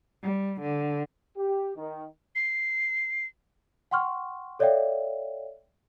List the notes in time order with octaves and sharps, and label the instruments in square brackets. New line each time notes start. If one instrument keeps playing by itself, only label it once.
[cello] G3
D3
[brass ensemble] G4
D#3
[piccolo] C7
[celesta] F#5 G5 C6 C#6 F6
A4 C#5 D5 E5 F5 G5